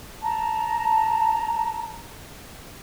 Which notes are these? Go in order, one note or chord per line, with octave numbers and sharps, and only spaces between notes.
A5 A#5